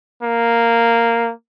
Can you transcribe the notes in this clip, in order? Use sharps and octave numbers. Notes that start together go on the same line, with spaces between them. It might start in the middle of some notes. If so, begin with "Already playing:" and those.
A#3